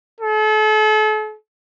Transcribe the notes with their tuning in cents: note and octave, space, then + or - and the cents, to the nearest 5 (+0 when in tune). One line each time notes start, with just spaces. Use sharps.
A4 -40